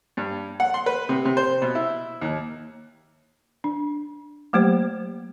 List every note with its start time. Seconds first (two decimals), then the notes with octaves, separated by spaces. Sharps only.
0.17 G2
0.60 F#5
0.74 C6
0.86 B4
1.09 C3
1.25 C3
1.37 C5
1.62 B2
1.75 E4
2.21 D#2
3.64 D4
4.53 F#3 A3 A#3 G4 C5